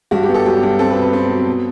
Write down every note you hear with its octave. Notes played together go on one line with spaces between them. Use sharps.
G2 F#4
G4
B3
A4
F#3 G4
G2
C4 A4
B4
B2
B4
C4
F#3
B2